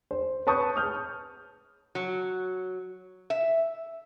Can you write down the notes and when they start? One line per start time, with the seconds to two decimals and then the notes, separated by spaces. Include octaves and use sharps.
0.11 C5
0.47 B4 C#5 A5 C#6 D#6 G6
0.76 D#6 F6 G6
1.95 F#3
3.30 E5